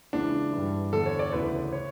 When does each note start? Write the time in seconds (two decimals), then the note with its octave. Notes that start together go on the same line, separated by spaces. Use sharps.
0.13 C#2 C#3 E3 D4
0.53 E3
0.58 G2
0.92 E2 D3 A4
1.06 C#5
1.19 D5
1.33 D2 C#3 E3 B4
1.72 C#5